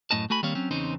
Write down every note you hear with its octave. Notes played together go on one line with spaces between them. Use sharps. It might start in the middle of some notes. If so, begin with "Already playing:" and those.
F#2 A2 C#4 D#5 A5
A3 F#4 G#5 B5
D#3 G3 A#3 C4 C#5 F5
F#3 C4 C#4
E2 C#3 C4 C#4 D#4 C5